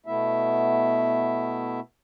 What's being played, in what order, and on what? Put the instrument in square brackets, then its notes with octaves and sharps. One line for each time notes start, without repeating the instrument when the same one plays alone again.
[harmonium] B2 A3 B3 E4 E5